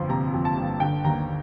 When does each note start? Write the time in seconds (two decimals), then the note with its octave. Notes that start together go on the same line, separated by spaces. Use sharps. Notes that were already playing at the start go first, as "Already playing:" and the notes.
Already playing: G1 F2 F3 C6
0.09 C3 A#5
0.34 F2
0.45 A5
0.57 G1
0.80 D3 G5
1.04 D#2 A#5